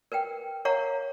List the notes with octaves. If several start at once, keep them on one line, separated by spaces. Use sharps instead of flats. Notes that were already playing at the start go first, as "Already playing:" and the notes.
A#4 B4 F#5 G5
A#4 C#5 F5 F#5 A#5 C#6